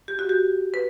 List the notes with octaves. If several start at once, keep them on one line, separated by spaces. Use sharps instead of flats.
G4
F#4
G4
B4